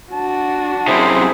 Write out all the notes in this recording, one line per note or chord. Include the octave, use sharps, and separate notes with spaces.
D4 F#4 A5
F#2 C3 E4 G#4 C5